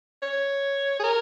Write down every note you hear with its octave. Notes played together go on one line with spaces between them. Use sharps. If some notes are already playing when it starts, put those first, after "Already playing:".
C#5
G#4
A#4